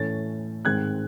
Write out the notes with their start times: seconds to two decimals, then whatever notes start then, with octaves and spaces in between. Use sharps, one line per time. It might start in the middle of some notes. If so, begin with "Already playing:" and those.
Already playing: A2 E3 A3 C#4 A6
0.65 G#2 D#3 G#3 C4 F#6 G#6